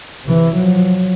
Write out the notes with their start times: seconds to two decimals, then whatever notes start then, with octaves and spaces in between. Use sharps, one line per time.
0.24 C3 E3
0.57 F3 F#3